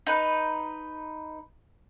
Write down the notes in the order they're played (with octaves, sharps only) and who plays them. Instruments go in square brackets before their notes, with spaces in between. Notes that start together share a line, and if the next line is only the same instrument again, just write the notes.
[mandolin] D#4 B4